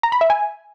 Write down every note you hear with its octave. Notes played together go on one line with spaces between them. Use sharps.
A#5
B5
E5
G#5